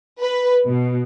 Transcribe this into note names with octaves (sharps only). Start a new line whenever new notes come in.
B4
B2